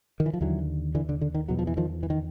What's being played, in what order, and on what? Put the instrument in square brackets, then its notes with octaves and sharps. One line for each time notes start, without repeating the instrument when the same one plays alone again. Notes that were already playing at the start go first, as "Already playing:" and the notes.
[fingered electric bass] D#3
E3
F3
D#2 D3 E3 F#3
D3 E3
D3
D3
D#3
E2 B2 F#3
F3
E3
D#3 F3
E3
D#3